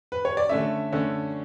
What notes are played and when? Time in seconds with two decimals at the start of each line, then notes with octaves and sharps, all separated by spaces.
0.12 B4
0.25 C#5
0.37 D5
0.49 D3 A3 C#4 E5
0.93 D3 A3 C#4